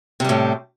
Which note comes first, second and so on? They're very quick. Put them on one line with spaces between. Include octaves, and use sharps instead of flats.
C3 G3 A2